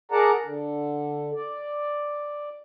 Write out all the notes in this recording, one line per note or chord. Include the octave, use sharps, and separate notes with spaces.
G#4 A#4 D5 F#5 A5 A#5
D3
D5